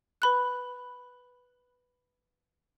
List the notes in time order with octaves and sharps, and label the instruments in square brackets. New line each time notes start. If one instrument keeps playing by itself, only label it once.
[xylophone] B4 B5 F#6